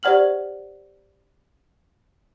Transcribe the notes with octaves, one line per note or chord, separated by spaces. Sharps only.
G4 C5 D5 F#5 F6 F#7